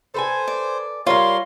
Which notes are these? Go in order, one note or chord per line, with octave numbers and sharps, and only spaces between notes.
A4 B4 C5 G#5
D5
G3 F4 A#4 C5 C#5 C6